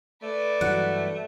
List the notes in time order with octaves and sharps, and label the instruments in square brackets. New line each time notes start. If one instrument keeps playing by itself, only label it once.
[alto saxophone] A3 [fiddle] B4 D5
[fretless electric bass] G2 E3 F#3 [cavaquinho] F#5